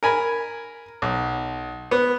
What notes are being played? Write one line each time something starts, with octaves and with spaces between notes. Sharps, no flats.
A#4 G#5 B5
B1
B3